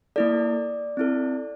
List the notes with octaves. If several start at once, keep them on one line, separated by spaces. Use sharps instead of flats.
A#3 E4 A4 D5
C4 E4 A4